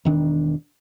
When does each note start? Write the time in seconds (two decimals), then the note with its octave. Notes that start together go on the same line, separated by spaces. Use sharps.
0.05 E1 D#3 D4